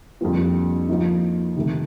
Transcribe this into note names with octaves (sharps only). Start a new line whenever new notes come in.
F2 D3 G3 A#3 F4
F3 A#3 D#4
C3 D#3 A3